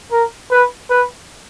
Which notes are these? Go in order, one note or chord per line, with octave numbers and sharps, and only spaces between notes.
A#4
B4
B4